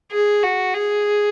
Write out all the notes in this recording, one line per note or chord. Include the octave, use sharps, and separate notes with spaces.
G#4
F#4
G#4